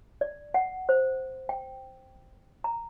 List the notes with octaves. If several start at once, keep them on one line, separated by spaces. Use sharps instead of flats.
D5
F#5
C5
G5
A#5